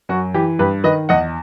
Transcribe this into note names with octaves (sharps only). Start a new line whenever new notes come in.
F#2 F#4
E3 G4
G2 G4 B4
D#3 B4 D#5
E2 D#5 F#5